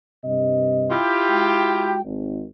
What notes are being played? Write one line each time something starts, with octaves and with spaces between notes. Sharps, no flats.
G2 C3 D#5
E4 F4 G4
G#3 F#4 G5
G#1